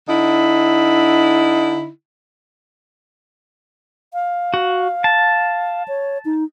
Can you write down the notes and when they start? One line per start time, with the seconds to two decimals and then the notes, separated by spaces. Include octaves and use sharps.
0.09 D3 D#4 E4
4.13 F5
4.54 F#4
5.04 A5
5.88 C#5
6.25 D#4